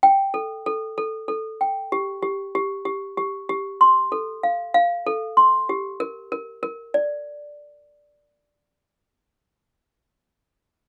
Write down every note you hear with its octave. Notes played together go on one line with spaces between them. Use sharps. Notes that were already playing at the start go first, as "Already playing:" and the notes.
G5
A4
A4
A4
A4
G5
G4
G4
G4
G4
G4
G4
C6
A4
F5
F5
A4
C6
G4
A#4
A#4
A#4
D5